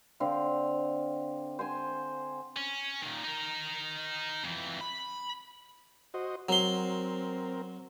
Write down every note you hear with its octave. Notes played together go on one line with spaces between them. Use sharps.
D3 C4 F5
C5 F#5 G#5
C#4
A#2 D#3
D#4 A#4
F2 E3
B5
F#4 C5 D#5
F#3 C4 A#4 C6